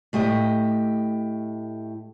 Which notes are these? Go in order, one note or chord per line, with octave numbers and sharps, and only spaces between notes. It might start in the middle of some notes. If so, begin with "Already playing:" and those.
A2 A3 G4 D#5